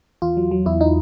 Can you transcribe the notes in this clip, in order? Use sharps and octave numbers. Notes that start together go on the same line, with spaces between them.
E2 F4
F#3
F#3
E2 E4
D#4